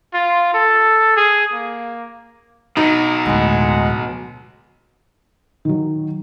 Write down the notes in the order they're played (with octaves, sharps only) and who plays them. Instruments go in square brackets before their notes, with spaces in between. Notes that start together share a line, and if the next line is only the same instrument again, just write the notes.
[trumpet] F4
A4
G#4
A#3
[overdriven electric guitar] B2 F#3 [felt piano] D#4
[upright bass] D2 A2 [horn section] G#3 F#5
[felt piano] D#3 F#3